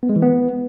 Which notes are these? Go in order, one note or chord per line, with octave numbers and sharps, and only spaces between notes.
B3
G#3
E3
B3